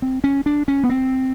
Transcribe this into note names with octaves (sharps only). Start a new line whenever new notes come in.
C4
C#4
D4
C#4
B3
C4